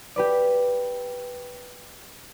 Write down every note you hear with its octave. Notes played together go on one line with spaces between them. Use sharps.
G4 B4 D5